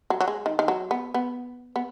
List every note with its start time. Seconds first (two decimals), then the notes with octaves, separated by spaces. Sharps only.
0.10 F#3
0.21 F#3
0.28 G#3
0.46 D#3
0.59 D#3
0.68 F#3
0.91 B3
1.14 B3
1.76 B3